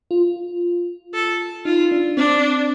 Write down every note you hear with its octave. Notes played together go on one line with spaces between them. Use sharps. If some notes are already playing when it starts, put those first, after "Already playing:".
F4
A4
D#4 F4
D4
C4 D4